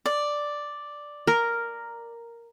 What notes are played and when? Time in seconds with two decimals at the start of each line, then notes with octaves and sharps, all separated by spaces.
0.06 D5
1.27 A#4